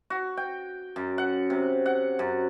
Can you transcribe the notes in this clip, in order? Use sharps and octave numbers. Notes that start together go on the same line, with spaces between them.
F#4
G5
F#2
F#5
C3
F#5
F#2